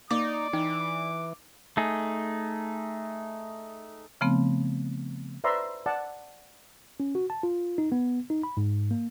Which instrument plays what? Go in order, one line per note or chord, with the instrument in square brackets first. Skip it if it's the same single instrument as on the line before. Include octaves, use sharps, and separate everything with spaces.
[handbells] A#3 [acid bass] D#4 [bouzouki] D5 [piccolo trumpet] D6
[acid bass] E3 [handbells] D#4 G5
[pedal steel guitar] A3 D#4 G#4
[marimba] C#3 F3 A3 B3 C4
[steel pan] B4 C5 D5 E5 A#5 C6
D5 F#5 A5
[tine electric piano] C#4
F#4
A5
F4
D#4
B3
D#4
B5
G#2
A#3